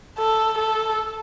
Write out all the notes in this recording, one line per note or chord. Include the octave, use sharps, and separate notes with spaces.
A4
A4